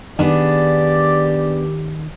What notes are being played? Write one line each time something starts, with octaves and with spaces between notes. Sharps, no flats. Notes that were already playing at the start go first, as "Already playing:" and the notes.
D#3 B3 D4 G4 G#4 D5